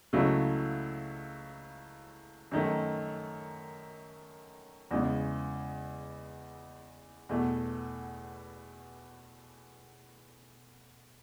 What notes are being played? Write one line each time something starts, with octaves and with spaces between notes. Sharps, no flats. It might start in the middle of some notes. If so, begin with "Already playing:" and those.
C#2 C#3 F#3 A3 E4
F#2 D#3 A3
E2 C#3 G#3
E2 B2 A3